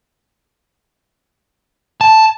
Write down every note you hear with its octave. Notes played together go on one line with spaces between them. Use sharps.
A5